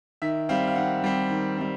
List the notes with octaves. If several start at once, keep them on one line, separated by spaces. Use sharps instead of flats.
D#3 E5
G3 C4 F5
F5
D#3 F#5
G3 C4
D#3
G3 C4